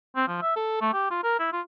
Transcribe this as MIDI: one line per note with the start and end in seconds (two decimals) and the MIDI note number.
0.16 0.26 60
0.28 0.41 53
0.42 0.55 76
0.56 0.76 69
0.81 0.90 57
0.93 1.09 67
1.11 1.19 65
1.23 1.37 70
1.39 1.49 64
1.53 1.61 65